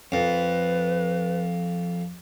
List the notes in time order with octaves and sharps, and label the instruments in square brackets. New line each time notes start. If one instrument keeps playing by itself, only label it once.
[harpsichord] F2 [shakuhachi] B4